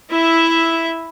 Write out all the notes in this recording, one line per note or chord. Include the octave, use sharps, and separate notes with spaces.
E4 E5